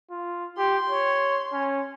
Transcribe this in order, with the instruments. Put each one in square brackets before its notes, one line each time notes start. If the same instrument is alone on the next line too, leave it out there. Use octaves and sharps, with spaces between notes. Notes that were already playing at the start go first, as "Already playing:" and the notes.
[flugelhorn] F4
[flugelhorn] G4 [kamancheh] C6
[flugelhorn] C#5
C#4